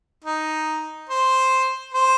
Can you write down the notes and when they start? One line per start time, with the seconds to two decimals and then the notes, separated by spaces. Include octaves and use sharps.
0.24 D#4
1.09 C5
1.94 C5